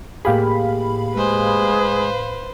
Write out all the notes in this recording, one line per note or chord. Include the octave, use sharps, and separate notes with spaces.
A2 A#3 G4 G#4 F5 B5
G#3 B4 C5